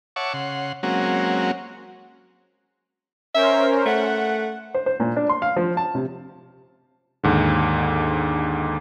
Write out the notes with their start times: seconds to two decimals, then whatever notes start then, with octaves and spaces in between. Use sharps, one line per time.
0.16 C#5 E5 F#5 A5 C#6 D6
0.33 C#3 F#5 C6
0.83 F#3 G#3 A#3 C4 C#4 F#4
3.34 C#4 A#4 C5 E5
3.86 A3 F#5
4.75 C5
4.86 C5
5.00 A#2
5.17 D4
5.29 C6
5.42 F5
5.57 F3
5.77 A5
5.95 C3
7.24 D#2 G#2 D3